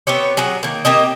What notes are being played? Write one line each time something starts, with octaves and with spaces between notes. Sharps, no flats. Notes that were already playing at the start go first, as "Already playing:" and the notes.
B3 C4 G4 C#5
F#3 G#4 F#5
D#3 A#3
A#3 C4 G4 D#5